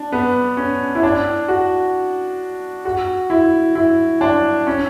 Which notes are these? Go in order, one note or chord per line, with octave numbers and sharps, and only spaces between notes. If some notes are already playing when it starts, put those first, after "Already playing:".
Already playing: D4
B3
C#4
E4
D4
F#4
F#4
E4
E4
D4
C#4